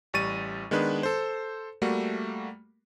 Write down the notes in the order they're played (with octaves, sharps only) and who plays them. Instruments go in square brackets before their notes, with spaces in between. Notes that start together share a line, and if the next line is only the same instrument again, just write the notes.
[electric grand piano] A1 G3 C#6 A6 D#7
D#3 G#3 B3 D4 B4
A4 C5
G3 A3 A#3 F#4